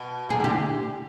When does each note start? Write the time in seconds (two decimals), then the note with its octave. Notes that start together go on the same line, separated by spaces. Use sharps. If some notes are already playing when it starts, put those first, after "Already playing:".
Already playing: B2
0.29 C3 G#4
0.40 D3 G4